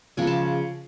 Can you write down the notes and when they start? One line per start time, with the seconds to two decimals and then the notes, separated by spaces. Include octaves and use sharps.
0.17 C#3 F3 G#3 G#5
0.27 A5